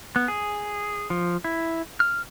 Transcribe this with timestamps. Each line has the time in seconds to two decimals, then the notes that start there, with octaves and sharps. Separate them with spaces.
0.16 B3
0.28 G#4
1.10 F3
1.44 E4
2.00 F6